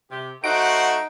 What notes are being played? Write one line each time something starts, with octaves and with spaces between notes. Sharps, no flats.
C3 G4
A3 D#4 F#4 C5 F#5 D7